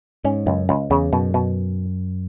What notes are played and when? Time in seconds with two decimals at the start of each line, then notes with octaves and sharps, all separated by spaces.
0.24 G#2 C#4
0.46 C#2 F#2
0.69 C#2
0.90 E2 C#3
1.12 F#2 B2
1.34 B2